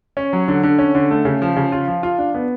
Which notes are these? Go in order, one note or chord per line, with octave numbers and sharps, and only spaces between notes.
C#4
F#3
D3
D3
C#4
D3
A3
C#3
F3
C#3
F4
F3
F4
D4
B3